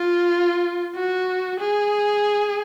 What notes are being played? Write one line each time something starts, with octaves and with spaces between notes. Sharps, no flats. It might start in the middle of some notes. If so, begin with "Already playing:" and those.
Already playing: F4
F#4
G#4